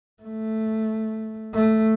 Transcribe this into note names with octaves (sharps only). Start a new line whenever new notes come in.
A3
A3